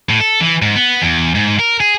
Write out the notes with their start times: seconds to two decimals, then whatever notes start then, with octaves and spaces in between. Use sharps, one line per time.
0.09 A2
0.20 A4
0.40 E3
0.62 G#2
0.75 B3
1.02 E2
1.35 G#2
1.59 A#4
1.80 G#4